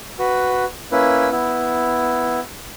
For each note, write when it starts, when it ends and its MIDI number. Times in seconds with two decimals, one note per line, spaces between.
0.19 0.65 66
0.19 0.65 71
0.92 1.29 58
0.92 1.29 61
0.92 1.29 64
0.92 1.29 71
1.32 2.40 59
1.32 2.40 64